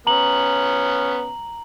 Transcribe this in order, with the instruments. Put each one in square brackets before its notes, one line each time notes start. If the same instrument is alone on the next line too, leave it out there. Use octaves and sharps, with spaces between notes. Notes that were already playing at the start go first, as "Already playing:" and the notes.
[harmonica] B3 C#4 [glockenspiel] A#5 F#7